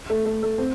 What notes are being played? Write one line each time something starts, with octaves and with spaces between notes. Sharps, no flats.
A3
A3
A3
C4